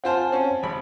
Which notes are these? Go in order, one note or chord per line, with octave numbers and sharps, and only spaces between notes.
C4 F4 C5 F#5 G#5 A5
C4 C#4
G#1 B5